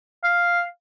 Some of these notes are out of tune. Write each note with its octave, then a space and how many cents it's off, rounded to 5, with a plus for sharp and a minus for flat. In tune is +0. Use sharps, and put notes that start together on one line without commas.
F5 +0